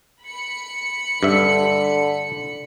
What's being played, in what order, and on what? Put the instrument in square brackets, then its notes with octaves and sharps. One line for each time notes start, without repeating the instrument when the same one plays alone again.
[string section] B5 C#7
[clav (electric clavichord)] G2 E5 [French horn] D3